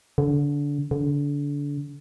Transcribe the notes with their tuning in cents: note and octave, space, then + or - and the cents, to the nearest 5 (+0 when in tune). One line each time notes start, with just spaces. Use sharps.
D3 -25
D3 -30